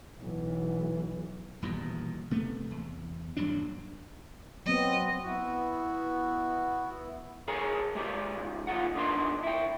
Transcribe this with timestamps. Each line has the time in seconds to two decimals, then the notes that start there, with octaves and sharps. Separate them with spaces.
0.20 B1 E3
1.62 D#1 E2 B2 G3
2.31 C3 A3 B3
2.70 E2
3.37 D#1 G2 F#3 D4
4.66 F#3 B3 C4 D#5
5.23 B3 E4 F#4
7.48 G#4 A#4 C#5 G#5 A#5
7.95 G#3 G4 C5
8.36 C#2 G#2
8.67 C#2 D#3 F4 F#5
8.95 F2 B2 D4 D#4 A#4 C6
9.43 E4 G5